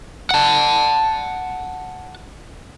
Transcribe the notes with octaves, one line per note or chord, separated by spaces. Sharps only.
F#5 A5